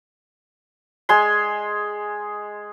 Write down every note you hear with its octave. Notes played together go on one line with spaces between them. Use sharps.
G#3 G#5 C6